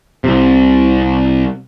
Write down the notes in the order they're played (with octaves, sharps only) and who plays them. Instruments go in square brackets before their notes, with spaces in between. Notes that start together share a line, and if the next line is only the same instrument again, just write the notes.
[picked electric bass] C2 C3